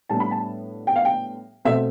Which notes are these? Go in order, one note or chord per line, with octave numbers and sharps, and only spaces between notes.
A2 G3 B3 D4 A5
B5
A5
G5
F5
G5
B2 A3 C4 E5